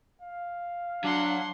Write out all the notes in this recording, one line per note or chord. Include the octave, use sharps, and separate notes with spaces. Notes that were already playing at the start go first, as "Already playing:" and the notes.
F5
F#3 D4 F#5 C6